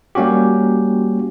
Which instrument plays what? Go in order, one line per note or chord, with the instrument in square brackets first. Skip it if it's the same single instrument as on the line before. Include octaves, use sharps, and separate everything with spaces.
[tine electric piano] G3 A#3 C#4 F#4 G4